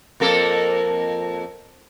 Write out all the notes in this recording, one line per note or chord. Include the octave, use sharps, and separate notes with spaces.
F2 A#3 A4